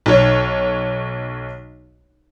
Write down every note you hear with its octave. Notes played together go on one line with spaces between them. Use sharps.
B1 C#5